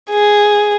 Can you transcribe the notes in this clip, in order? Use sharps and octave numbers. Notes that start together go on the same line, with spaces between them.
G#4